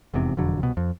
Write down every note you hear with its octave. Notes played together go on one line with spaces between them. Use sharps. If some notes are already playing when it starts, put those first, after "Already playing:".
F1 E2 G#2 C3
E1 F2 D3 F#3
C2 B2
F2